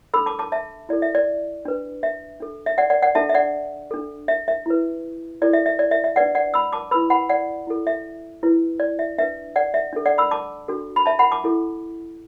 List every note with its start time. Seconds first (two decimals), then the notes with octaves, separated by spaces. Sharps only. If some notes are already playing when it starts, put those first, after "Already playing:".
0.14 D4 A4 B5 E6
0.26 A5 D6
0.39 A5 D6
0.52 E5 A5
0.89 E4 A4 D5
1.02 E5
1.15 D5
1.65 D4 B4
2.03 E5
2.40 D4 A4
2.66 E5
2.78 D5 F#5
2.90 D5 F#5
3.03 D5 F#5
3.15 D4 A4 E5 A5
3.29 E5
3.34 D5 F#5
3.91 D4 A4
4.28 E5
4.48 E5
4.66 E4 B4
5.42 E4 A4 D5
5.53 E5
5.66 E5
5.79 D5
5.91 E5
6.04 E5
6.16 D4 B4 D5 F#5
6.35 D5 F#5
6.54 B5 E6
6.72 A5 D6
6.91 E4 B4 B5 E6
7.10 F#5 B5
7.29 D5 F#5
7.67 E4 A4
7.87 E5
8.43 E4 B4
8.80 D5
8.99 E5
9.18 D4 B4 E5
9.56 D5 F#5
9.74 E5
9.93 D4 A4
10.06 D5 F#5
10.18 B5 E6
10.31 A5 D6
10.68 D4 F#4 A4
10.96 B5
11.06 E5 A5
11.19 F#5 B5
11.31 A5 D6
11.44 E4 A4